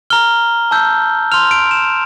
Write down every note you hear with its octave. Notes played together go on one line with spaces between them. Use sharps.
A#5 F6 G7
A5 E6 G6
C6 F6 F7
D7
E7